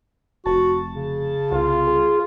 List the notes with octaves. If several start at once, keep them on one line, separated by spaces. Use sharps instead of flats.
F1 F#4 A5
C#3
C2 F4
G#4